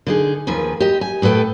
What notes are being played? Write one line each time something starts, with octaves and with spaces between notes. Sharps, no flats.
D3 D#4 G#4
D#2 D#3 F3 B4 G#5
G4 D#5
G#5
A2 B3 A4 B4 G5